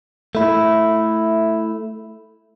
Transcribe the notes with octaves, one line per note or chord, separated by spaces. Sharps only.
A3 E4